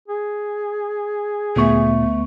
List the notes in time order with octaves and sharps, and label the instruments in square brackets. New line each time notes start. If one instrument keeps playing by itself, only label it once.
[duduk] G#4
[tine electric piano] D2 B3 C#6 [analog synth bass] A#2 [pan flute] A3